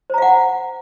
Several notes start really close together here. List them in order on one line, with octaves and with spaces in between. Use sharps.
C5 A#5 F5 F#5